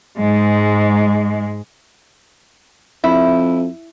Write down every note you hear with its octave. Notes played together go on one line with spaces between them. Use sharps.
G#2 G#3
F2 E4